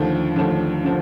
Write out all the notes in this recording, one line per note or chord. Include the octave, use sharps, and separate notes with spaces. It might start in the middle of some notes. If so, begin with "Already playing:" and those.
Already playing: D#2 D3 F3 A3
D#2 D3 F3 A3
D3 F3